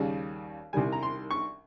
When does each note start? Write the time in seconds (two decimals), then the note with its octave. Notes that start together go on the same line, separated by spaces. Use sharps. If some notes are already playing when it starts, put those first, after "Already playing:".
Already playing: D#2 C#3 G3
0.73 C2 C3 D#3 G3 G#5
0.92 A#5
1.03 C6
1.30 C#6